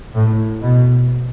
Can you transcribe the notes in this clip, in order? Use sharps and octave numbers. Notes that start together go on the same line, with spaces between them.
A2
B2